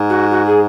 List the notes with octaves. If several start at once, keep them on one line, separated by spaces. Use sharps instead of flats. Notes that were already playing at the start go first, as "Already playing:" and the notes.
Already playing: G#2
F#4
F#4
G#4